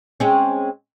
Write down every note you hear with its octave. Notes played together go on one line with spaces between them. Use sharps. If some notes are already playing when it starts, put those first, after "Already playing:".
G#3 C4 C#4